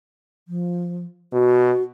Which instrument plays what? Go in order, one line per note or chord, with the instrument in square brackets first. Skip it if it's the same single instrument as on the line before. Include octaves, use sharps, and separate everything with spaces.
[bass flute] F3
[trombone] B2 [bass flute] F#4